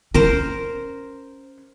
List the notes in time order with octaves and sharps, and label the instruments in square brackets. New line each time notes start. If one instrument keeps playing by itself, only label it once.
[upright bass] C#4 [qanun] A#4 C5